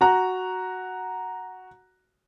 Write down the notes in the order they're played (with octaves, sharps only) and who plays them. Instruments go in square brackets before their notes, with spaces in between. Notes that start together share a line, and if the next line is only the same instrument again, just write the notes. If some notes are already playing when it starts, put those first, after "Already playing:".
[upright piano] F#4 A#5 F#6